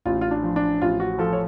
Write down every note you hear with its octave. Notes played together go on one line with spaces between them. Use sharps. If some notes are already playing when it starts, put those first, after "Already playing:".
A1 F4
F4
D4
F3
D4
A1 F4
F#4
F3 A4
C#5